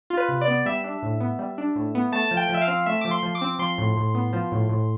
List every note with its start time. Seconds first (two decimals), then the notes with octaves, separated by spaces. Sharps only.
0.10 F4
0.17 B4
0.29 C3
0.41 D5
0.48 B3
0.66 G3 E5
0.84 D4
1.03 A2
1.20 B3
1.39 G3
1.58 D4
1.76 A2
1.95 B3
2.12 A3 A5
2.31 F3
2.37 G5
2.49 F3 E5
2.62 F5
2.68 C4
2.86 A3 E5
3.01 F3 D6
3.11 C6
3.23 F3
3.35 D6
3.41 C4
3.59 F3 C6
3.78 A2
3.97 A2
4.15 B3
4.33 F3
4.52 A2
4.69 A2